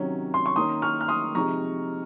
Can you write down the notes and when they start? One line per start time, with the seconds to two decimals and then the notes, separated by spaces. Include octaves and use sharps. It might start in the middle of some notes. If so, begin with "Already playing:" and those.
Already playing: C3 D#3 F#3 C#4
0.34 C6
0.46 C#6
0.56 D#3 A#3 C#4 C6 D#6
0.82 C#6 F6
1.01 F6
1.08 C6 D#6
1.35 C3 F3 G#3 D#4 A#5 C#6